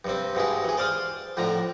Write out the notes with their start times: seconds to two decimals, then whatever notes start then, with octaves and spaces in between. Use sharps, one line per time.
0.05 G2 C3 C4
0.35 G2 B2 G#3 E4
0.65 E3 G#4
0.77 C5 D5 F5 C6 D#6
1.37 F2 A2 D3 A#5